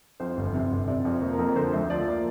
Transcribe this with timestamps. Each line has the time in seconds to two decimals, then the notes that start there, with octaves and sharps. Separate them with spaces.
0.20 F2 C5
0.37 G1
0.54 C3
0.71 G1
0.88 C3 D5
1.05 F2
1.11 C5
1.21 A#3
1.33 A#4
1.39 F2
1.56 D3 C5
1.73 D2
1.90 F3 D5
2.07 A#3